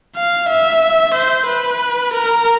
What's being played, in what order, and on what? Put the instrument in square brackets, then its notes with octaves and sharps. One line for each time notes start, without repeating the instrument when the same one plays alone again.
[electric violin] F5
E5
C5
B4
A#4